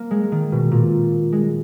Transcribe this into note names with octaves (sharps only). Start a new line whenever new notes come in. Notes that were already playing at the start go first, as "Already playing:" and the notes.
Already playing: A#3
G#3
D#3
B2
A#2
G#3